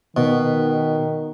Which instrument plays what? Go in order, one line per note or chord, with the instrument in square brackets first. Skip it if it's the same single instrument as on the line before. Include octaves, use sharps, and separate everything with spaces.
[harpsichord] B2 [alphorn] D#3